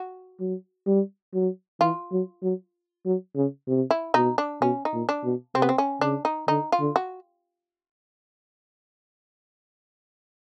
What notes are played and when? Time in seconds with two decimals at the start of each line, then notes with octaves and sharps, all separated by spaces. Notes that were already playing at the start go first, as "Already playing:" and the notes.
Already playing: F#4
0.40 F#3
0.87 G3
1.34 F#3
1.81 E3 F4
2.12 F#3
2.43 F#3
3.06 F#3
3.36 C#3
3.68 C3
3.91 E4
4.14 B2 D#4
4.38 D4
4.61 B2 C#4
4.85 D#4
4.93 A#2
5.09 D4
5.24 B2
5.55 C3 C4
5.62 B3
5.69 C4
5.78 C#4
6.01 C#3 D4
6.25 D#4
6.48 D3 D#4
6.72 F4
6.80 D3
6.96 F#4